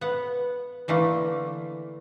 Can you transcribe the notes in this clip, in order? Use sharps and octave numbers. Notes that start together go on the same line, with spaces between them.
B3 F#5
D3 E3 A3 A#3